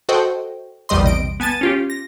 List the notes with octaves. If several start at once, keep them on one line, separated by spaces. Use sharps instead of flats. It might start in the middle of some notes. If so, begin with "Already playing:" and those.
F#4 A4 C5 D#5 G5
A#1 E2 G3 D#5 C6
C3 D#5 D7
B3 G#5 A5 A6 D#7
C#4 F4 G4
A#6